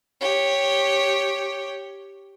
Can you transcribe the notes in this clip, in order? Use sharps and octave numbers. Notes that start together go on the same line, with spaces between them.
G4 C#5